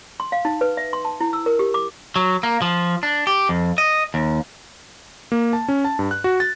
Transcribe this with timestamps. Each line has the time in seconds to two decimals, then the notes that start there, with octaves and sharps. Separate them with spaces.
0.20 C6
0.32 F5
0.45 D#4
0.61 B4
0.77 E5
0.93 C6
1.05 A5
1.20 E4
1.33 E6
1.46 A#4
1.59 G4
1.74 D6
2.16 F#3
2.43 A#3
2.62 F3
3.03 D4
3.27 G4
3.49 F2
3.78 D#5
4.14 D#2
5.32 A#3
5.53 A5
5.68 C#4
5.85 A5
5.99 G2
6.11 F#6
6.24 F#4
6.40 A6